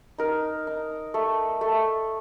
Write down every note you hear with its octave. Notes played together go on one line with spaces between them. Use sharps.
D#4 A#4
D#4
A3
A3